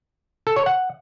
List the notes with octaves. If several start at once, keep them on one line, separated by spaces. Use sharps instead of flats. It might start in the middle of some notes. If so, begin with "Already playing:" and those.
A4
C#5
F#5